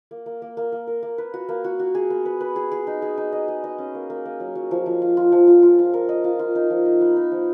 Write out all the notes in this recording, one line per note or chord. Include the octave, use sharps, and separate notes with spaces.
A#3
A#3
A#3
A#3
A#3
A#4
A#3
B4
F#4
A#3
F#4
F#4
G#4
B3
B4
B4
G#4
G#4
D#4
G#4
D#4
D#5
G#4
D#5
C#4
A#3
A#3
A#3
F#3
F#3
F3
F3
F4
F4
F3
F4
F4
F4
A#4
D#5
F4
F4
D#4
F3
D#4
B3
D#4
F3